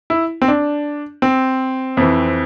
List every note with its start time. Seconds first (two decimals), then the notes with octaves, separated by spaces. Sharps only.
0.10 E4
0.42 C4
0.48 D4
1.22 C4
1.97 F2 E3